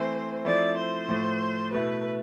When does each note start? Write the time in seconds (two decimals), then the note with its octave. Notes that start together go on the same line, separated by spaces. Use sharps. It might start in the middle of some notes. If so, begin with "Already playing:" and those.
Already playing: E3 A3 C4 E4 C5
0.45 F3 A3 C4 E4 D5
0.77 C5
1.08 A2 F3 A3
1.72 B2 A3 E4 B4